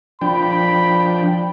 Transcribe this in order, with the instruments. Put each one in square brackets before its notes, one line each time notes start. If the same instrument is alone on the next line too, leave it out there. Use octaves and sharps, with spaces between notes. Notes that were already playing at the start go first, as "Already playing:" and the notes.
[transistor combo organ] F3 D4 G5 [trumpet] B5